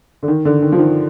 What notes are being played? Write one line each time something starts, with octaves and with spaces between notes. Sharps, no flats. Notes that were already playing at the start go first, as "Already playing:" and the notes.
D3
D#3
D3
D#3
F3
D#3